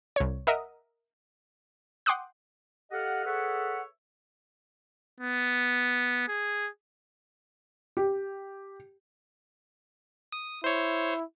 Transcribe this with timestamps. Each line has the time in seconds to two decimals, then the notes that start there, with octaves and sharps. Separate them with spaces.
0.16 C2 C#5
0.47 A#4 D#5 E5 F#5 D#6
2.06 F#5 G5 C6 D6 D#6 F#6
2.91 G4 A4 D#5 F5 F#5
3.26 G#4 A4 B4 C#5 E5 F#5
5.20 B3
6.28 G#4
7.97 G4
10.32 D#6
10.64 E4 C5 C#5